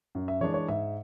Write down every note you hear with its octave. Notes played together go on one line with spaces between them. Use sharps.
F#2
E5
E3 G#3 D4 C#5
C#5
G#2 E5